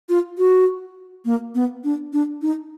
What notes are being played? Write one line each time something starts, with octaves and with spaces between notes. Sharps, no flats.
F4
F#4
A#3
B3
D4
D4
D#4